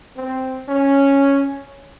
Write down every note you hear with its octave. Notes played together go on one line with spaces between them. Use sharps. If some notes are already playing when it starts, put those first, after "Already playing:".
C4
C#4